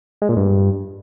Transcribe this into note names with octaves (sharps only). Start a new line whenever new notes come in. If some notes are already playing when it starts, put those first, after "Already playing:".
G#3
A#2
G2